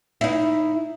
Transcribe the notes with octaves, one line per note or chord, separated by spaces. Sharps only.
D#4 E4